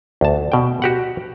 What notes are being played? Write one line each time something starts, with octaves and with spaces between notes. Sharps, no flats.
D2 A5
B2 G5
F#4 G4 F#5